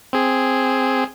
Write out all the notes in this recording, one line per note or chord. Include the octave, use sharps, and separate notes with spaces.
C4 G#4